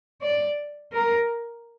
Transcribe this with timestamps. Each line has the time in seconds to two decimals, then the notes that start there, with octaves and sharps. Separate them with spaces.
0.22 D5
0.92 A#4